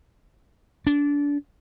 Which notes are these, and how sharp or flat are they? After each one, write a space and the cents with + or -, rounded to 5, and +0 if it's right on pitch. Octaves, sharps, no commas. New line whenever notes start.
D4 -25